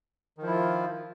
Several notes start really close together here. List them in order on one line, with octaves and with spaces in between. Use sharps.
D#3 F3 E4 F4